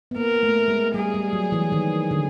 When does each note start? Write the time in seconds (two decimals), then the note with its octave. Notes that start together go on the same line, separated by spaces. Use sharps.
0.11 B3
0.16 A#3 A#4
0.43 A3
0.68 G#3
0.94 G3 G#4
1.14 G3
1.33 F#3
1.52 E3
1.72 D#3
2.11 D3